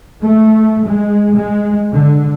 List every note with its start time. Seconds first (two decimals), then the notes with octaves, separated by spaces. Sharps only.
0.22 A3
0.86 G#3
1.36 G#3
1.93 D3